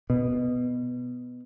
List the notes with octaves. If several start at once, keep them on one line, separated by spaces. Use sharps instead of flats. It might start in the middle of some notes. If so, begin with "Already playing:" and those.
B2